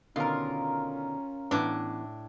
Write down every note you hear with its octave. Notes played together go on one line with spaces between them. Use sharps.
B2 D3 D#3 C#4 F4 A#4
A2 E3 B3 D4